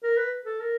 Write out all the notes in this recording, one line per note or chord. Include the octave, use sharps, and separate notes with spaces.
A#4
B4
A4
A#4